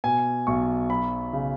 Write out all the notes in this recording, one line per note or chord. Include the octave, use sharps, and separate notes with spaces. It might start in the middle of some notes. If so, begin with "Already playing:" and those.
B2 G#5
B1 C#6
F#3 B5
C#3